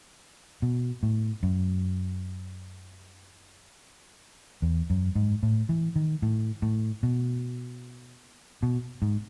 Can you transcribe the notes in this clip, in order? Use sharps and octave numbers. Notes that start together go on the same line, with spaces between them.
B2
A2
F#2
E2
F#2
G#2
A2
E3
D#3
A2
A2
B2
B2
G#2